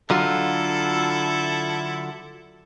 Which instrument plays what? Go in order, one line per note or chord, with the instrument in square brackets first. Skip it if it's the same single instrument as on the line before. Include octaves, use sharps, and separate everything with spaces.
[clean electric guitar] D3 F#3 F4 [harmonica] E4 A4